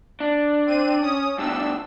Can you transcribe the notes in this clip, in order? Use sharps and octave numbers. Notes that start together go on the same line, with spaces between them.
D4
C4 D#7
C#4 D#6
G2 B2 D4 E6